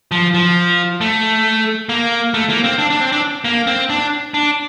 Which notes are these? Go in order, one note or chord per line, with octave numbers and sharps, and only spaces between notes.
F3
F3
A3
A#3
A3
A#3
C4
D4
D4
C4
D4
A#3
C4
D4
D4